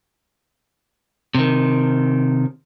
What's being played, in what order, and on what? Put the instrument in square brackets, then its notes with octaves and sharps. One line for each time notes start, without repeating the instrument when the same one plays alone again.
[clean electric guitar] C3 D#3